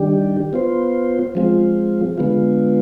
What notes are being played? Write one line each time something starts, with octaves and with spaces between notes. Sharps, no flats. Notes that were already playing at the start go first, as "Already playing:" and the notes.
Already playing: D#3 G3 D4 G4
B3 F4 C5
F3 G#3 C4 F4
D3 G#3 B3 F4